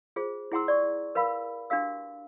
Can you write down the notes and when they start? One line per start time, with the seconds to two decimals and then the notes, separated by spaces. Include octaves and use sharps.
0.16 F4 G#4 C5
0.52 E4 G#4 F#5 A#5 C6 E6
0.68 D5 C#6
1.15 A#4 B4 F5 B5
1.70 D4 F#4 G4 F5 E6